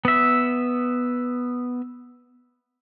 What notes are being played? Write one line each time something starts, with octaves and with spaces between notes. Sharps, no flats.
B3 E5